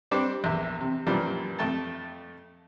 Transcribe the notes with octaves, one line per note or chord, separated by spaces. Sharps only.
G3 C4 D4 D6
A#1 E2 E5
C3
F#2 A#2 E3 F3 G3 D4
F2 A3 G5 A5